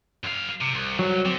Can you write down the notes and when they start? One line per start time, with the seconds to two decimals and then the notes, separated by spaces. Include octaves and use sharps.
0.24 F#2 F5
0.61 C3
0.74 C2
0.99 F#3
1.25 D3 C4